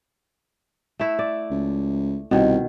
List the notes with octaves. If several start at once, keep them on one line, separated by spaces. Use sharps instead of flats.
A3 E4
D5
C#2
C2 B2 D#3